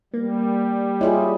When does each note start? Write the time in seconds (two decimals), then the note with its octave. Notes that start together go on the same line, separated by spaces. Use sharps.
0.14 G3 A#3
1.01 E4 F4 G#4 C#5 D#5